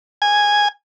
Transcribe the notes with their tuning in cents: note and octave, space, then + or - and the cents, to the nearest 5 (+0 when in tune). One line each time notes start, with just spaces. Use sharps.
G#5 -5